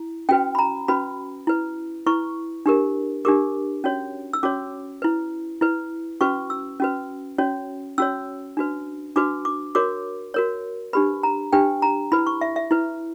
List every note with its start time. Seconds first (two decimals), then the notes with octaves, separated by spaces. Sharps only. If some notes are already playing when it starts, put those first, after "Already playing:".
Already playing: E4
0.29 C#4 F#4 B4 G5
0.55 B5
0.59 A#5
0.88 C#4 F#4 B4 B5
1.47 E4 B4
2.07 E4 B4 C#6
2.66 D4 G4 A#4
3.25 D4 G4 A#4 D6
3.84 C#4 F#4 C#5
4.33 E6
4.43 C#4 F#4 C#5 D6
5.02 E4 B4
5.61 E4 B4
6.21 C#4 F#4 B4 C#6
6.50 E6
6.80 C#4 F#4 B4
7.38 C#4 F#4 C#5
7.98 C#4 F#4 C#5 E6
8.57 D4 F#4 B4
9.16 D4 F#4 B4 D6
9.45 D6
9.75 F#4 A#4 C#5 D6
10.34 F#4 A#4 C#5
10.93 D4 G4 B4 B5
11.23 A#5
11.53 D4 G4 B4 G5
11.82 A#5
12.12 E4 B4 B5
12.27 C#6
12.41 E5
12.56 E5
12.71 E4 B4